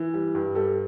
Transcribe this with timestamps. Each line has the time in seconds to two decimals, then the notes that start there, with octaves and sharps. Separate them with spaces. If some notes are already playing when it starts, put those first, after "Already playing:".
Already playing: E3
0.14 G3
0.35 G2
0.55 G3 A4